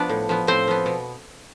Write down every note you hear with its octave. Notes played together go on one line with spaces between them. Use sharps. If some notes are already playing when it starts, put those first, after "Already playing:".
Already playing: F3 B3 D4 D5
A2
F3 B3
A2 C4 C5
F3 B3
B2